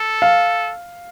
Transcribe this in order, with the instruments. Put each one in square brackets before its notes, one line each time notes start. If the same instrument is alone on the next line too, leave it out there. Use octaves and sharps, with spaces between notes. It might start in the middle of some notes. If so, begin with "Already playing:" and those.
Already playing: [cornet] A4
[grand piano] F5